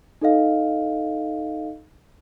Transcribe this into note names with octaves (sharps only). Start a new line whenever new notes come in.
D#4 A4 D#5 F5